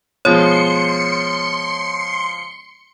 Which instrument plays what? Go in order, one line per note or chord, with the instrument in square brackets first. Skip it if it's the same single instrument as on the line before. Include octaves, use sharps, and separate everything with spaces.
[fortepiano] B2 F3 G#3 [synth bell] C#5 [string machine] C6 C#7